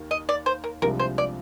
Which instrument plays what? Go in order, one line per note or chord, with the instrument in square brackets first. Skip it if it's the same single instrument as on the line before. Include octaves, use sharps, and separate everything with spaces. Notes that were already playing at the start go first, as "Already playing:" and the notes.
Already playing: [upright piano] D#2 D#3 A#3
[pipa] D#5
D5
C5
A#4
[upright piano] C2 C3 F3 G#3 D4 [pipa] A#4
[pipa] C5
D5